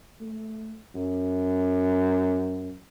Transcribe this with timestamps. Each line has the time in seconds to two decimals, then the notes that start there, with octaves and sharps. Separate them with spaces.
0.20 A3
0.95 F#2